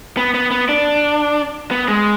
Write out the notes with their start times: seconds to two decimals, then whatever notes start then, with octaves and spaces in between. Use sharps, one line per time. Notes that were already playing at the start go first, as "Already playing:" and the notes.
0.17 B3
0.34 B3
0.51 B3
0.69 D4
1.71 B3
1.88 G#3